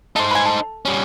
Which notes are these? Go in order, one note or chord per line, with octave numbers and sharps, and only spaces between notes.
A3 D#4 C5
B4 G#5
A4
G3 C#4